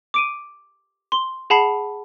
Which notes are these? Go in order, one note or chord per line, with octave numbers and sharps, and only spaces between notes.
D6 D7 D#7
C6 G7
G#4 F#5 A5 B5 C7